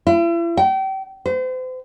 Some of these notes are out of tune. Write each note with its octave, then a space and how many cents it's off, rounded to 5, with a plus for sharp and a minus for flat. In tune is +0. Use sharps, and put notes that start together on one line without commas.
E4 +40
G5 -35
C5 -40